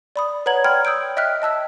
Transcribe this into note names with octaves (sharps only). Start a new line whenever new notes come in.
D5 B5 D#6
B4 C#5 F#5 A#5 G#6 F#7
D5 G5 B5 C6 F6 G#6
D#6 E6 G6 D7
D#5 E5 G5 F6 F#6 B6
D#5 A5 E6 F#6